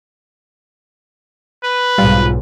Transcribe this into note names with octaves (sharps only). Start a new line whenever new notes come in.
B4
B1 G#2 G3 F4